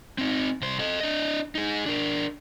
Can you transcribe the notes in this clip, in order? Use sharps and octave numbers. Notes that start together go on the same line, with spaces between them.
C4 D#4
C2 C5
A4 D#5
D4 D#5
D#4 G#4
D4 A#4